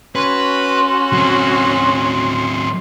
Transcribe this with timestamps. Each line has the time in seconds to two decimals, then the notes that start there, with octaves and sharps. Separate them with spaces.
0.16 C#4 F#4 B4 C6
1.13 F#3 C4